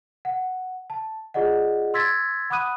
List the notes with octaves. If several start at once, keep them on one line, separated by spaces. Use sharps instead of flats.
F#5
A5
F4 G#4 D5 D#5 F#5
C6 E6 G#6 A6 B6
F#5 B5 D6 D#6 F#6 D#7